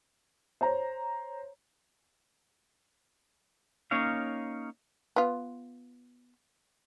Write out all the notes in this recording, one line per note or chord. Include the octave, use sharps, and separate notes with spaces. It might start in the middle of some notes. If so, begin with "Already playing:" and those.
C5 C#5 A#5
A#3 C#4 D#4 C#5 F5
B3 F4